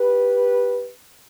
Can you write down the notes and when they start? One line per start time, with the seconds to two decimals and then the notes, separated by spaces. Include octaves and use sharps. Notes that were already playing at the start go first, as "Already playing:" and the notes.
Already playing: G4 B4